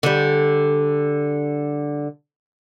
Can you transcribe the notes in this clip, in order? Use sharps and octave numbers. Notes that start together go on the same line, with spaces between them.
D3 G3